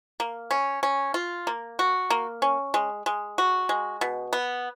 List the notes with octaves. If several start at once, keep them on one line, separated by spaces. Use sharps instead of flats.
A#3
C#4
C#4
F4
A#3
F#4
A#3
C#4
G#3
G#3
F#4
G#3
B2
B3